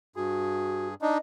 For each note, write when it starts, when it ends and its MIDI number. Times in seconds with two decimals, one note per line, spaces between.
0.16 0.94 43
0.16 0.88 66
0.16 0.94 68
1.02 1.18 62
1.02 1.18 63
1.02 1.19 75